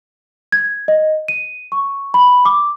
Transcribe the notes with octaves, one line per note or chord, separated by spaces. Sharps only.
G#6
D#5
D#7
C#6
B5
D6